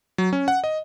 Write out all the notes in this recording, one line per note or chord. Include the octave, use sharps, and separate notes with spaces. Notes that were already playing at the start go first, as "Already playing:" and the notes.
F#3
C#4
F#5
D#5